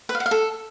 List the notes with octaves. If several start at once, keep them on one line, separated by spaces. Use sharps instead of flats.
B4
F5
F#5
F5
A4